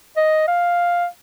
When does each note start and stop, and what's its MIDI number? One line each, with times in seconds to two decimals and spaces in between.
0.17 0.46 75
0.48 1.06 77